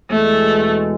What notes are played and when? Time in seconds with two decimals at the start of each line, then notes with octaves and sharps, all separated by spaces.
0.10 E2 B2 G#3 A3